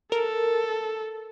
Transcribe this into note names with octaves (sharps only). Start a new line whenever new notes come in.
A4 A#4